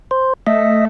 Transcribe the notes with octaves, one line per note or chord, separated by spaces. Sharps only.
C5
A3 D#5 E5